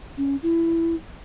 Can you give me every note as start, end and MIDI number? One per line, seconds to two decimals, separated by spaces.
0.17 0.36 61
0.43 0.95 64